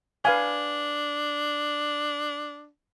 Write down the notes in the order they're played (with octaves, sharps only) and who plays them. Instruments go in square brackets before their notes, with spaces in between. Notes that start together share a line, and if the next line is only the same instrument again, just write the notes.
[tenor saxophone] D4 [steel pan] B4 F5 G#5